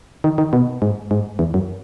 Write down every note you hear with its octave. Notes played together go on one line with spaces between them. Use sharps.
D#3
D#3
B2
G#2
G#2
E2
F#2